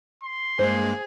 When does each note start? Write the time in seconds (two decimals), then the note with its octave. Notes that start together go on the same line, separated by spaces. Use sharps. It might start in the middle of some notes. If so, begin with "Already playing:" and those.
0.24 C6
0.59 G2 G#3 A#3 G#4 C5